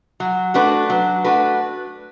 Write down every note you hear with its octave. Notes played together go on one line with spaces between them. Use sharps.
F#3
A3 D4 F#4 B4
F#3
A3 D4 F#4 B4